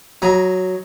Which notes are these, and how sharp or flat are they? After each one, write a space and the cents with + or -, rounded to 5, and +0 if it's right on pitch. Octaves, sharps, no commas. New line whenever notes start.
F#3 +0 D#5 +0 A#5 +40